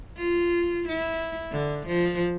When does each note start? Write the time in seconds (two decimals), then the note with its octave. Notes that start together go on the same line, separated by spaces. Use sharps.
0.17 F4
0.88 E4
1.52 D3
1.87 F3